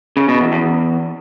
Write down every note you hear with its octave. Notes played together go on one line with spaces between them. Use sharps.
C#3
B2
E2
E2